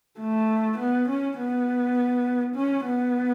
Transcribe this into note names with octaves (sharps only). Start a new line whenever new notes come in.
A3
B3
C#4
B3
C#4
B3